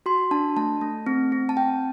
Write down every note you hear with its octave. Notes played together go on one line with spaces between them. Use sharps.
F#4 C6
D4 A5
A3 A5
A3
C4
C4
A5
C4 G5